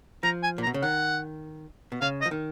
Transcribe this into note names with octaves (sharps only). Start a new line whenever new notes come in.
F3 A#5
G#5
A#2
A#5
B2
C#3
D#3 F#5
B2
C#3 F5
D#5
F3
D#3